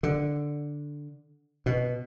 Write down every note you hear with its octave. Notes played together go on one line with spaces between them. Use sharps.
D3
B2